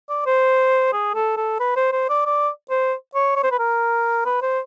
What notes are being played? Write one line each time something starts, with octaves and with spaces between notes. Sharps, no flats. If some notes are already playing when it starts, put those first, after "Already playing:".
D5
C5
G#4
A4
A4
B4
C5
C5
D5
D5
C5
C#5
C#5
C5
B4
A#4
B4
C5